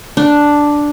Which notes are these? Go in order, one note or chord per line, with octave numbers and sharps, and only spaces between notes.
D4